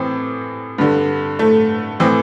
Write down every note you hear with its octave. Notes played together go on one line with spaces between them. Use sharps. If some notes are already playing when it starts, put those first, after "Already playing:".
Already playing: A2 E3 C4
G2 D3
A3
A2 E3 C4